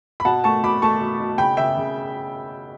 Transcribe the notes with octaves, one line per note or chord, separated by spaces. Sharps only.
B5
B2 F#5 A5
A3 A5 C#6
B2 B5 D6
A3 A5 C#6
B2
B2
C#3 G5 B5
C#3 E5 G5
C#3